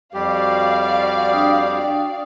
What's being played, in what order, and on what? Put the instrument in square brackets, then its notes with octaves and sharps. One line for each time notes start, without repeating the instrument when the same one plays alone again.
[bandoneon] F2 G3 G4 [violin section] F#4 D5 F5
[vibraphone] D4 G5 D#6